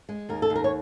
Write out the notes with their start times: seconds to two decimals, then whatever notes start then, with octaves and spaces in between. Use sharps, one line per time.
0.09 G#3
0.29 D#2 A#4
0.42 A4
0.50 D#2
0.56 A#4
0.64 C#5